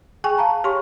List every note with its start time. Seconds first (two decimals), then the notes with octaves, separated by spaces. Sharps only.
0.24 G#4 G5 G#5 C#6
0.38 F5 A5 A#5
0.64 G4 C#5 C6 C#6